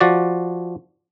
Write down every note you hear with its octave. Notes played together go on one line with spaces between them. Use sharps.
F3 F#4 D5